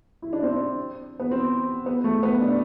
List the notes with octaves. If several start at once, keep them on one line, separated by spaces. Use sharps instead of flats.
E4
D4
C4
D4
B3
C4
B3
A3
B3
D4